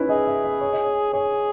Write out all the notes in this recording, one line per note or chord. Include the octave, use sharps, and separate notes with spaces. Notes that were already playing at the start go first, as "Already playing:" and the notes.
Already playing: C#4 D#4 E4 B4
G#4 D#5
E5
E5
C#5
D#5
C#5
G#4 C#5